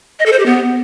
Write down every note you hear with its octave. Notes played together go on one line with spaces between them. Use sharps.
D#5
A4
C5
G4
B3